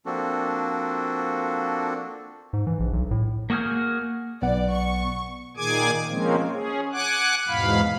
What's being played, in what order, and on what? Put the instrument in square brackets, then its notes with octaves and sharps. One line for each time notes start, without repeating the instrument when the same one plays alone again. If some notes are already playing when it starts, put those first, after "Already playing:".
[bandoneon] F3 A#3 C4 D4 F#4 A4
[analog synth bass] G#2
E3
A#1
B1
A2
[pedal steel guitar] A#3 F#4 G#4 F6 G6
[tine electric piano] B1 B3 F#5 [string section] D5
[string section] C#6
[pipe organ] A#2 D#3 G#4 G#5 D6 G#6
F3 G#3 A#3 C4 C#4
C#4 G#4
F#5 G#5 D6 F#6
E2 G#2 B2 F5 B5